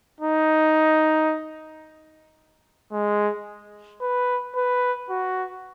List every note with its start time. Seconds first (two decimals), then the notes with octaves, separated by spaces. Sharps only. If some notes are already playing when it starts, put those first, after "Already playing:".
0.21 D#4
2.92 G#3
4.01 B4
4.56 B4
5.10 F#4